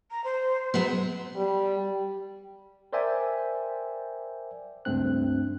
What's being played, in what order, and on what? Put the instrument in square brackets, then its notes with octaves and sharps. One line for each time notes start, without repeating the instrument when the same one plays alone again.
[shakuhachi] A#5
C5
[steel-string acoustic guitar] F#3 G#3 B3
[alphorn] G3
[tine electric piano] A#4 C5 D5 E5 G5 G#5
C#2 G2 A3 C4 F#6